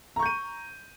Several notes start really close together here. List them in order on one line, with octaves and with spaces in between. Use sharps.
A#5 C#6 G6 D#7